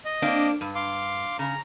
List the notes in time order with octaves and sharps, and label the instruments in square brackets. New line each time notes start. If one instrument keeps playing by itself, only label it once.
[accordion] D#5
[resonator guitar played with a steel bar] A#3 C4 D4
G2
[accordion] F5 C6 D6
[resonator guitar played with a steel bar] C#3 [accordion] A#5